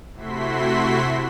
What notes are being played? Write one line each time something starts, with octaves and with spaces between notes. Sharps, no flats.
C3 A3 E4 F#4 C6 B6